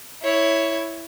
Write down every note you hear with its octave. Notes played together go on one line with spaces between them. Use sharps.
E4 C#5